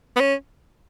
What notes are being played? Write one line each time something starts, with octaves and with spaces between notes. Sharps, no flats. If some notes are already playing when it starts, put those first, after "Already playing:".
B3
C#4